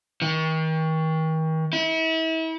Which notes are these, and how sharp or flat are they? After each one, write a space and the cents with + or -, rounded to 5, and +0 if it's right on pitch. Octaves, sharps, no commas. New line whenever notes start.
D#3 +40
E4 -35